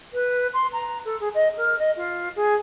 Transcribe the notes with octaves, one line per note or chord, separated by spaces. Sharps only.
B4
C6
A#5
A4
G#4
D#5
A#4
D#5
F4
G#4